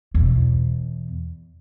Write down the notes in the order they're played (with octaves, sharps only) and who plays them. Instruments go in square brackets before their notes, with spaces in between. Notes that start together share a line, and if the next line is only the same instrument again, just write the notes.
[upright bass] E2 B2